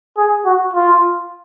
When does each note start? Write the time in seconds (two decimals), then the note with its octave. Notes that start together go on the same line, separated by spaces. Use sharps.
0.18 G#4
0.45 F#4
0.74 F4